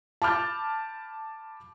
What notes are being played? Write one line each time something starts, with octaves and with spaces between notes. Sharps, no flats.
A5 B5 D6 F6 G6 A6